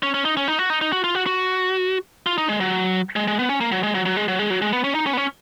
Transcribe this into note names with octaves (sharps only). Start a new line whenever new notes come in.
C#4
C#4
D#4
C#4
D#4
F#4
D#4
D#4
F#4
F4
F#4
F#4
F4
D#4
G#3
F#3
G#3
G#3
B3
C#4
A#3
F#3
G#3
F#3
F#3
G#3
F#3
G#3
F#3
G#3
B3
C#4
D#4
C#4
B3
C#4